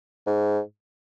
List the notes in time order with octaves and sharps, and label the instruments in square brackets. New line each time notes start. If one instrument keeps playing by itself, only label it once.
[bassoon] G#2